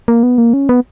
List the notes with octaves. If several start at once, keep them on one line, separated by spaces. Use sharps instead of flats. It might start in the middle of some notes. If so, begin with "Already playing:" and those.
A#3
B3
A#3
C#4
B3